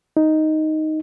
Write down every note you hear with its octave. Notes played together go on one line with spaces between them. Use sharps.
D#4